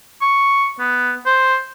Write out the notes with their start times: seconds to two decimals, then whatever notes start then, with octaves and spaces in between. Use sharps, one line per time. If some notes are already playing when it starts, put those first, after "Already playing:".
0.22 C#6
0.80 B3
1.26 C5